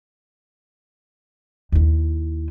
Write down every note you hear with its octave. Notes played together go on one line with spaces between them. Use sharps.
D#2 E4